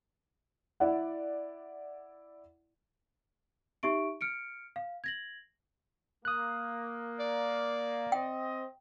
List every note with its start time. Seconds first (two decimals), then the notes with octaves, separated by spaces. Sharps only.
0.80 E4 D5 F#5
3.83 D#4 G4 E5 C#6 D7
4.21 F6 C#7 D7
4.76 F5
5.04 G#6 A#6 F#7
6.25 A#3 D#6 F#6
7.20 D5
8.12 C4 D#5 G5